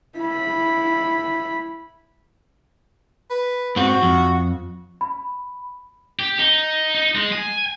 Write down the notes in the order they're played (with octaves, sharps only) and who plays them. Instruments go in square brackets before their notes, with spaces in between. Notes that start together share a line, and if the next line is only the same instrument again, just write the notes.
[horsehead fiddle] E4 B5
[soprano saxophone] B4
[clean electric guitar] G#2 C4 [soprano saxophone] F#4
[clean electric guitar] F2
[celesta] B5
[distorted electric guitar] G4
D#4
D#4
G#3
G#5